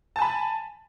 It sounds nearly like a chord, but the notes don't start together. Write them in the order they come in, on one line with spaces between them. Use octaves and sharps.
A5 G#5 B5